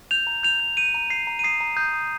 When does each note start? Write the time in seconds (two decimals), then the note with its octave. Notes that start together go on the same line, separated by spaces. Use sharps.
0.11 G6 F7
0.27 A#5
0.43 G6 F7
0.60 G6
0.77 G6 D#7
0.94 A#5
1.10 G6 C7
1.27 A#5
1.39 D#7
1.44 D#6 C7
1.61 A#5
1.77 D#6 G6
1.93 D#6